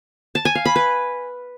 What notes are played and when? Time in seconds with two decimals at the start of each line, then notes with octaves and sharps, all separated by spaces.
0.35 A5
0.45 G#5
0.55 F5
0.65 B5
0.76 B4